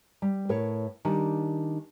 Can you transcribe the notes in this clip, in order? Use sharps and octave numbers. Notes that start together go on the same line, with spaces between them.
G3
A2 A#4 B4 C#5
D#3 G3 D4 G#5